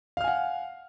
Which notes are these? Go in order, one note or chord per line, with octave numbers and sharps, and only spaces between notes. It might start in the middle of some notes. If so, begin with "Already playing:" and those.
F5 F#5 G#5 F6